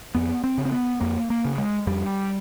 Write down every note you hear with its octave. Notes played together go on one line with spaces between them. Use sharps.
F2 B3
C4
C#3
C4
B3
F2 A#3
A#3
C#3
G#3
F2 G3